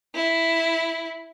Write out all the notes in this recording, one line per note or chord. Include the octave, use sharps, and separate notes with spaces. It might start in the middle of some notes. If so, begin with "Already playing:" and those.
E4